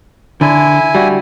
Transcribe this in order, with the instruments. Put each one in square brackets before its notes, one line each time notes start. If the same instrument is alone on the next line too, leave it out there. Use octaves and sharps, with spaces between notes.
[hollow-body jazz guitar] D3 [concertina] E4 G#5
[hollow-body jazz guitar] G3 F#4